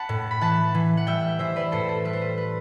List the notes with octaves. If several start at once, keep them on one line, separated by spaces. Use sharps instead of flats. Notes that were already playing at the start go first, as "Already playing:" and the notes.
Already playing: F#5 A5 B5
A2
B5
E3 F#5 A5
E3
F#5
G3 E5 G5
E3 C5 E5
B4 D5
A2 A4 C5
A4
G3 B4
C5
B4
B4